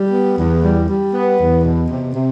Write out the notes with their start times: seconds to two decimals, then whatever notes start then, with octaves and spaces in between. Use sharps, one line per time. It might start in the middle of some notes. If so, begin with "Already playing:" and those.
Already playing: G3
0.10 B3
0.36 E2
0.62 G3
0.88 G3
1.12 B3
1.38 E2
1.64 B2
1.88 C3
2.14 C3